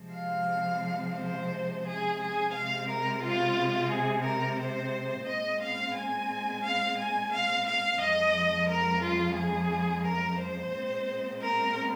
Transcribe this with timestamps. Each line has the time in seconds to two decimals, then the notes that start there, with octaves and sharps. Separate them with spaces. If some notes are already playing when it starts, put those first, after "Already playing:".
Already playing: C3 F3 G#3 C4
0.14 F5
1.16 C5
1.85 G#4
2.19 G#4
2.52 C3 G#3 C4 F5
2.87 A#4
3.21 F4
3.89 G#4
4.24 A#4
4.57 C5
5.25 A#2 G#3 C4 D#5
5.60 F5
5.94 G#5
6.62 F5
6.96 G#5
7.31 F5
7.64 F5
7.98 F2 F3 G#3 D#5
8.67 A#4
9.01 F4
9.35 G#4
10.04 A#4
10.38 C5
10.72 A#2 G#3 C4
11.40 A#4